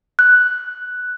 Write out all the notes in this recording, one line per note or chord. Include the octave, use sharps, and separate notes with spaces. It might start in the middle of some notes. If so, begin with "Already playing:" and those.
F#6